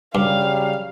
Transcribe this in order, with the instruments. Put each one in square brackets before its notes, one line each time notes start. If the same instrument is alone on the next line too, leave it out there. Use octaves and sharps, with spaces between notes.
[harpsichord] G2 [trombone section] C#3 F#3 G3 [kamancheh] F5